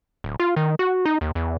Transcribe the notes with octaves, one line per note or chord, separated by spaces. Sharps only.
D1
F4
D#3
F#4
D#4
D#2
E2